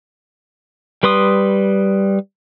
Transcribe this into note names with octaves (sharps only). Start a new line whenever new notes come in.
G3 B4 C6 D#6